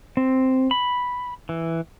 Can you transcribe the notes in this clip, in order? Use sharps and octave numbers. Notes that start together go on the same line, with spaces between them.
C4
B5
E3